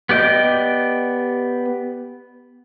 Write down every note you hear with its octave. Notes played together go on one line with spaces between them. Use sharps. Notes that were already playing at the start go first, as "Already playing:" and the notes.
B3 G4 D5 D#5 G6